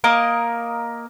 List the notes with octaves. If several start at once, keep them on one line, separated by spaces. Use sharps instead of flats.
A#3 A#4 D#5